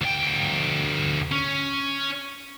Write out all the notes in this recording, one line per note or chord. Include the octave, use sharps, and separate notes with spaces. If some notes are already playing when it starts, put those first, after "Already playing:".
D2 G5
C#4